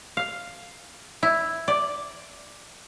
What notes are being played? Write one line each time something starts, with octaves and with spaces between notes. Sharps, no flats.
F5
E4
D5